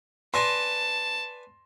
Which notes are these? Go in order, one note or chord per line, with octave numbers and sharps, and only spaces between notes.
B4 D5 G#5 A5 C6 A#6